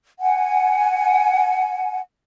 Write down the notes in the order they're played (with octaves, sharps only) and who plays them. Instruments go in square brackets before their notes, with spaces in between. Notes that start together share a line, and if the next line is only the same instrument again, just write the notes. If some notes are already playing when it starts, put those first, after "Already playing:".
[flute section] F#5 G#5